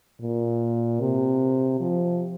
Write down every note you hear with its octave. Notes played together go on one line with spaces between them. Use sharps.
A#2
C3
F3